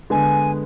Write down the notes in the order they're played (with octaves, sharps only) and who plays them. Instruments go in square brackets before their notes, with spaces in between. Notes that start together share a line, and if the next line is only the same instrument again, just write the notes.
[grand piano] D3 G#3 B3 [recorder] G#5